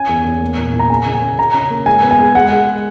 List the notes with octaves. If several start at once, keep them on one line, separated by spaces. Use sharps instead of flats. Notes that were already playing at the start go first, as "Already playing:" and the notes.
Already playing: C#4 G#5
E2
E2
A#3
A#2
A#2
A#5
C#3 G#5
C#3
G#5
C#3
C#3 A#5
C#4
A#3
G#3 G#5
B3
G#5
G#3
G#3 F#5
G#3